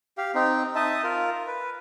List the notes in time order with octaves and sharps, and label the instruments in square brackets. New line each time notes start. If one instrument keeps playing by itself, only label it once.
[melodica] G4 F5
C4 D#4
D#4 D#5 E5 A5
F4 A#4
B4